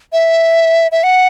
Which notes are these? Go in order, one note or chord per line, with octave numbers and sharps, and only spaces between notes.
E5
E5
F#5